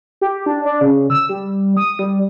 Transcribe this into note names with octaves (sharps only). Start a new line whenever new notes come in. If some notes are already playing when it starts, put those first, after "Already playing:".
G4
D4
D4
C#3
E6
G3
D#6
G3